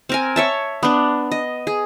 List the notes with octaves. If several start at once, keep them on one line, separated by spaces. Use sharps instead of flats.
C4 A#4 G#5
C#5 E5 A5
B3 D4
D#5
G#4